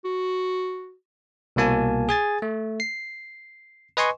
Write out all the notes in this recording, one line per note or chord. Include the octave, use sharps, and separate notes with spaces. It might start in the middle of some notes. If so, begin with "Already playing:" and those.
F#4
C2 B2 A#3 G#5 A5
G#4 G#5 A6
A3
C7
B4 D#5 G#5 C6 C#6